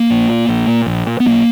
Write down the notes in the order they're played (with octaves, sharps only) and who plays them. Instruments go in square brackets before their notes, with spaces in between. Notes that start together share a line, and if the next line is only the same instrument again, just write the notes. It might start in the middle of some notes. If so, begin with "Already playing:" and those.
Already playing: [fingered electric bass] A#3
A#1
A#2
A#1
A#2
A#1
A#2
B3
B1 A#3